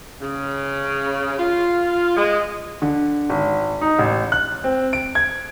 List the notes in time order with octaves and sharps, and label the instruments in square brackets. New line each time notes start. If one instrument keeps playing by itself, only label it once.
[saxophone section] C#3
F4
G#3
[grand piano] D3
G#1
D#4
A1
F#6
C4
D7
G#6